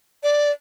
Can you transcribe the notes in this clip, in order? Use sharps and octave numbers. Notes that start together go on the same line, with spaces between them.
D5